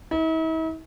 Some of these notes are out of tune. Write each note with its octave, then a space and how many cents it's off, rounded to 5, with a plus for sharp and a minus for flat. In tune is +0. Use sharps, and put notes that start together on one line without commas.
E4 -45